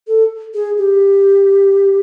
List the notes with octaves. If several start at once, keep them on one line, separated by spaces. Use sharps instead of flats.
A4
G#4
G4